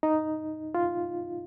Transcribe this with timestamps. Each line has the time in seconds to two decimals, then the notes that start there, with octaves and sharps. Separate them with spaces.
0.03 D#4
0.75 F4